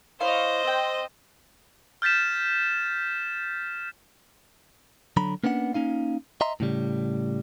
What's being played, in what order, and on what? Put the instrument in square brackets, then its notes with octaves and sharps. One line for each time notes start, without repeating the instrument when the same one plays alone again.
[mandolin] E4 C#5 F5 [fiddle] C5 D#5
[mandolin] C4 G5
[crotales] F6 G6 A6 B6 E7
[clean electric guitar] D3 F#3 A#5 B5
A#3 B3 C#4 D4 F#5
A#3 C#4 D#4 F5
D#5 E5 A#5 C6
A2 C#3 G3